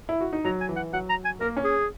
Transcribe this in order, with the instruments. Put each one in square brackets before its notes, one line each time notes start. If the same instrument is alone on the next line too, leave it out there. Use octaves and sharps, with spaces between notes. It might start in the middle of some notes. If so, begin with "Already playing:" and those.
[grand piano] E4
F#4
D#4
[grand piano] F#3 [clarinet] A#5
[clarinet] G#5
[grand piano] E3
[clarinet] F#5
[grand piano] F#3 [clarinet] F#5
[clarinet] A#5
G#5
[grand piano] A#3 [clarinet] A#4
[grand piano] C#4
[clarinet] G#4